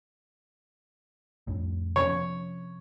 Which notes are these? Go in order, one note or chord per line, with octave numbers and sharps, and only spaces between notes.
F2 A2
C3 F3 C#4 C#5